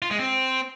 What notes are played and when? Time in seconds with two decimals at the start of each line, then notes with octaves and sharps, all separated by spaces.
0.02 F4
0.11 G#3
0.19 C4